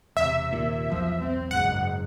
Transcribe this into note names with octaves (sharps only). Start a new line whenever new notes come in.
E1 C3 E5
D#2 A#2
E1 B1 F3
C4
F#1 G#2 F#5